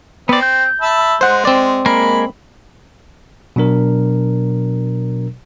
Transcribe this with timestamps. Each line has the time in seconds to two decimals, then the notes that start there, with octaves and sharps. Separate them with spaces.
0.29 B3 C4 D5
0.42 G6
0.81 E5 A5 B5
1.21 G#3 C5 F#5
1.45 C4 D5
1.86 G#3 A#3 A#4 B5
3.56 B2 F#3 D4 A#4